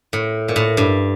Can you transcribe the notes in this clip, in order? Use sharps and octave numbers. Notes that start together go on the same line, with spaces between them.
A2
A#2
A2
G2